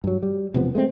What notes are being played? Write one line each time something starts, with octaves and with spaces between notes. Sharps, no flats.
G2 F#3
G3
E1 C3 F3 B3
G#3 A3 C4